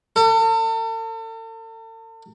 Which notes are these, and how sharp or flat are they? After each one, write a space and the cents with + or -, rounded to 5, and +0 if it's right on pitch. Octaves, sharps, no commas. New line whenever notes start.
A4 +40